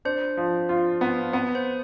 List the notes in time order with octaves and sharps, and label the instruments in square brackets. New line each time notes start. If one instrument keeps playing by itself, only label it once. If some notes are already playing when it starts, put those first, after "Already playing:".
[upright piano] D4 [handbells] C5
[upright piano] F3
F4
B3
B3
[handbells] C5